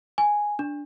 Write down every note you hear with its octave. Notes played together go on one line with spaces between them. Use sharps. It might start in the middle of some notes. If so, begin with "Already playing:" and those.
G#5
D4